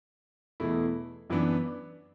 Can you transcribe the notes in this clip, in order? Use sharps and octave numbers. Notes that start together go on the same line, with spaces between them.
E2 B2 A3 E4
F#2 E3 B3 D4